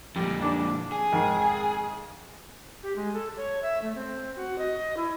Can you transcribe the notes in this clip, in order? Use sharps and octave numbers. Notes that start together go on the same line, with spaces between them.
F2 A#2 G3
D4 A5
G#4
F2 G#2 D#3
G4
G#3
A4
C#5
E5
A3
C4
F#4
D#5
E4